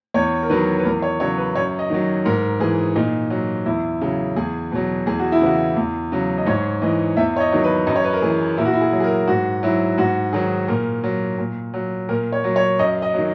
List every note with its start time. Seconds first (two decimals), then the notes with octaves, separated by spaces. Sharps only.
0.14 E2 C#5
0.43 A#4
0.50 D#3 F#3 B4
0.79 B4
0.85 E2 A#4
1.02 C#5
1.20 C#3 F#3 C#5
1.38 B4
1.55 F#2 C#5
1.79 D#5
1.90 D#3 F#3
2.25 G#2 A#4
2.60 E3 G#4
2.96 A#2 D#4
3.30 F#3
3.66 E2 E4
4.01 C#3 F#3 G#4
4.36 E2 G#4
4.72 B2 F#3
5.06 E2 G#4
5.20 F#4
5.32 E4
5.41 C#3 E3 F#4
5.77 E2
6.12 C#3 F#3
6.38 D#5
6.46 G#2 C#5
6.82 E3 D#5
7.17 E2 E5
7.36 C#5
7.40 D#5
7.52 D#3 F#3
7.64 B4
7.87 F#2 D#5
7.96 C#5
8.04 B4
8.13 A#4
8.22 E3 G#4
8.58 A#2 E4
8.66 F#4
8.73 E4
8.81 G#4
8.93 F#3
9.00 G#4
9.04 A#4
9.28 G#2 F#4
9.63 F#3 E4
9.98 G#2 F#4
10.33 D#3 F#3 G#4
10.68 A#2 A#4
11.04 F#3
11.38 A#2
11.74 F#3
12.09 A#2 A#4
12.33 C#5
12.44 F#3
12.56 C#5
12.79 F#2 D#5
13.02 D#5
13.14 D#3 F#3